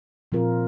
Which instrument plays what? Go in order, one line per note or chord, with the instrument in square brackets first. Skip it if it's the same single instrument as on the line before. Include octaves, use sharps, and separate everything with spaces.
[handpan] A#2 F3 C4 F4 A#4